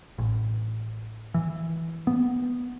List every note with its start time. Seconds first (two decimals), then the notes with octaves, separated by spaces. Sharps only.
0.18 A1
1.34 E3
2.07 B3